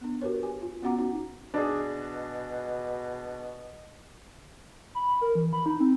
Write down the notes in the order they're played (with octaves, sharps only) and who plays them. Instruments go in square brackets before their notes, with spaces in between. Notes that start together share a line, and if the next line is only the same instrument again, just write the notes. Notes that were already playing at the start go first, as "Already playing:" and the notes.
[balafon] B3 D4
F#4 G4 A#4 B4 C#5
G4 G#5
F4
B3 C#4 F#4 F#5 A#5 D6
C#4 D#4 F#4
[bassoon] B2 [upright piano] D4 G#4
[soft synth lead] B5
A#4
E3
B5
D#4
C4